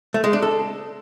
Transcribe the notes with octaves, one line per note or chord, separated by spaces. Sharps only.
A3
G#3
D4
A4